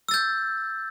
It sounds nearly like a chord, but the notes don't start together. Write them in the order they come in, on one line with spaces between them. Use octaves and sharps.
E6 A6 G6